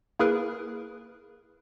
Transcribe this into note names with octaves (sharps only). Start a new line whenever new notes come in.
A#3 E4 G#4 A#4 B4